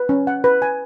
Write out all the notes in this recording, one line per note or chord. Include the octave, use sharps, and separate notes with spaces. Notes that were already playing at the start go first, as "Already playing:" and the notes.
Already playing: B4
C#4
F#5
B4
G#5